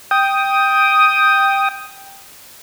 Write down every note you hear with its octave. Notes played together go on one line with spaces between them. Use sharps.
G5 D#6